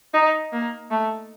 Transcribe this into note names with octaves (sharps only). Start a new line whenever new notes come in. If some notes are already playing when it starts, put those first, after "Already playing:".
D#4
A#3
A3